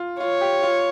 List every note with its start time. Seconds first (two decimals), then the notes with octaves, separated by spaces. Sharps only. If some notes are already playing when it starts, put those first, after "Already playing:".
Already playing: F4
0.20 F4 C#5
0.41 G4
0.63 F4